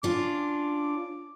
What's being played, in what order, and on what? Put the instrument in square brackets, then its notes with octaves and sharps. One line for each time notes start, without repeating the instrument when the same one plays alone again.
[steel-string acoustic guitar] C#4 D4 F4 [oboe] D6